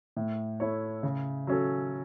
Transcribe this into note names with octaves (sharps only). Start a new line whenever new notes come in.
A2
A3 E4 C#5
C#3
F#3 C#4 A4